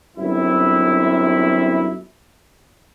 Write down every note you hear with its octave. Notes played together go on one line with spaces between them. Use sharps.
G1 F#2 C4 E4